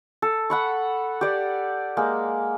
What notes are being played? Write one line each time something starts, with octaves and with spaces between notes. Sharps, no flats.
A4
F#5 B5 C#6
G4 D5 F#5
G#3 A#3